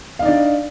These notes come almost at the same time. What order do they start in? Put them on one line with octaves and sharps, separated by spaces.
F5 D#4 D5 D4